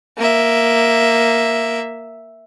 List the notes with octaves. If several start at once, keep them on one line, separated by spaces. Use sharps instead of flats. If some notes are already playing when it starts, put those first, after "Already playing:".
A#3 E5